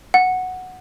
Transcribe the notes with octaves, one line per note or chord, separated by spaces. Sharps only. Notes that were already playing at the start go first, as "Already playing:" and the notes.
F#5